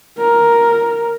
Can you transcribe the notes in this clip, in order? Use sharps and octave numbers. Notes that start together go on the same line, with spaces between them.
A#4